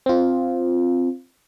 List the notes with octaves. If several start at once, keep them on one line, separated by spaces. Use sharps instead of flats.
C4 F4